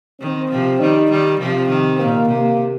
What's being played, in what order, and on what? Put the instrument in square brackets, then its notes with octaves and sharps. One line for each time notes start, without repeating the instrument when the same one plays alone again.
[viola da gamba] D#3 [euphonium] C4
[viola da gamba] C3 F3
[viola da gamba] D#3 G3 [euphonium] D#4
[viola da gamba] D#3 G3
[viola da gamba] C3 F3 [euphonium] C4
[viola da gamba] D#3
[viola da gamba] A#2 [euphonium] A#3
[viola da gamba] C3 [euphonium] A#3